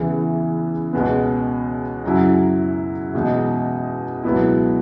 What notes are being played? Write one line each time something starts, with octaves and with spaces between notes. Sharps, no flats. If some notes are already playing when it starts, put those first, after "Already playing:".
Already playing: E2 C#3 E3 B3
C#2 B2 G#3 B3
F#2 C#3 F#3 C#4 E4
E2 B2 G#3 D#4
C#2 B2 F#3 B3 E4